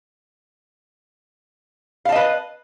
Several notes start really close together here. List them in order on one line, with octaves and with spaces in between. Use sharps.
F5 A5 D#5 B4